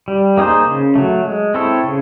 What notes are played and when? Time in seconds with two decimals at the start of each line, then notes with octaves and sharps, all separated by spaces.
0.08 G3
0.37 A#3 D#4 G#4 C5
0.66 C#3
0.95 F#3 A3
1.25 G#3
1.54 C4 E4 A4 C#5
1.84 C#3